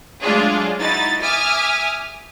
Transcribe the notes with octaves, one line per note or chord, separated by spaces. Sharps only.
F#3 G#3 A3 D4 F4 G#4
D#4 E4 F#4 A6
E5 G#5 D6 D#6 F6